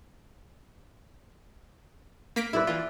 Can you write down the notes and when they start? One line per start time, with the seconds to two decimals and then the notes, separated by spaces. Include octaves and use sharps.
2.36 A#3 B6 D7
2.53 E4 B4 D5 E5
2.67 E3 F4